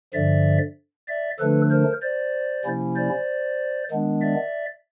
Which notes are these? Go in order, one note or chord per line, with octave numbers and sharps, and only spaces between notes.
G2 D3 F3 D5 E5
D5 E5
D3 F3 A3 D4 A4 B4
A#4 C5
C5 D5
C3 F3 A#3 C#4 E4
C5 D5
D#3 G#3 B3 D4
D5 E5